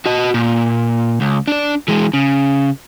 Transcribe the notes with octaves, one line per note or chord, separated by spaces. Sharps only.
F#4 D#5
A#2
C#2
D4 D5
E3 G#3
C#3